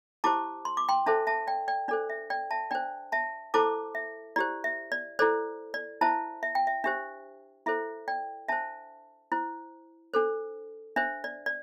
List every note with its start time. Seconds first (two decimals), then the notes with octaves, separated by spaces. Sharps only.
0.24 E4 G4 C5 A5 D6
0.65 C6
0.77 D6
0.89 G5 C6
1.06 D4 A4 C5 E5 A5
1.27 E5 A5
1.47 D5 G5
1.68 D5 G5
1.88 D4 A4 C5 D5
2.10 E5
2.30 D5 G5
2.51 E5 A5
2.71 D4 C5 D5 G5
3.12 E5 A5
3.54 E4 A4 C5 A5 D6
3.95 E5
4.36 E4 G4 C5 D5
4.64 E5
4.92 D5
5.19 E4 A4 C5 D5
5.74 D5
6.01 E4 C5 E5 A5
6.43 E5
6.55 G5
6.67 E5
6.84 D4 G4 C5 E5
7.66 E4 A4 C5 E5
8.08 D5 G5
8.48 D4 C5 E5 A5
9.32 E4 C5
10.14 D4 A4 C5
10.96 D4 C5 E5
11.24 D5
11.46 D5